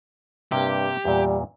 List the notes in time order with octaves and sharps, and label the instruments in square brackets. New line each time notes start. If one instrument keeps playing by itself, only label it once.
[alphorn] G2 [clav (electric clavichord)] C3 A#3 [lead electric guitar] G4
[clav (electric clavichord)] E2 A#2 [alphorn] G3